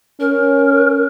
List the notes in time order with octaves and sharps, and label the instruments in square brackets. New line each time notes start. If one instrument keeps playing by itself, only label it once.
[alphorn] C#4 [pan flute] A#4